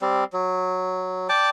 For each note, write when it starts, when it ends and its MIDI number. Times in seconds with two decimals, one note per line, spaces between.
0.02 0.24 55
0.02 0.24 60
0.33 1.28 54
1.29 1.50 74
1.29 1.50 79
1.29 1.50 81
1.29 1.50 86